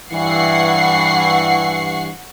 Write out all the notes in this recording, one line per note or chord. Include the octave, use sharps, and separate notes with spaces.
G2 E3 F#5 C#6 C7